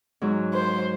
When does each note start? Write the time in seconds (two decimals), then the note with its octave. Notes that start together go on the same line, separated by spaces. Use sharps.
0.21 G#2 F#3
0.54 C5